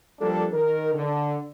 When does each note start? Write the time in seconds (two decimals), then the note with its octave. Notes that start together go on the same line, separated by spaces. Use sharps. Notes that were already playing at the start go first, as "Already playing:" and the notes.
0.19 F3 G3 A#3 D4 A4
0.52 D#3 A#4
0.94 D3